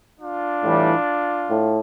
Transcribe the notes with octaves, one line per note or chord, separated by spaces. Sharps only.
D4 F4
A2 E3 G3
A2